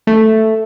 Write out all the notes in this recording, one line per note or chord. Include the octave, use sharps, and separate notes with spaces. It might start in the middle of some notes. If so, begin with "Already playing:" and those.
A3